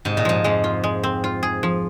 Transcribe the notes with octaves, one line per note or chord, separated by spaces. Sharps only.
G#2 C3
A#2
G#2 F3
F2 G#3
F4
G#3
C4
F4
G#4
F3